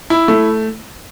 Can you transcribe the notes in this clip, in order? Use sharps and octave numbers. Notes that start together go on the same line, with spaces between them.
E4
A3